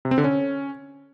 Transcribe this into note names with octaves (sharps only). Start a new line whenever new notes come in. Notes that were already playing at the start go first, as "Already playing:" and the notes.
C3
C4
D3
C#4